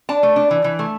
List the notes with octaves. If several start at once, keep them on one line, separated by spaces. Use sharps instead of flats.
D4 A5
A3
D4
E3
E3
A3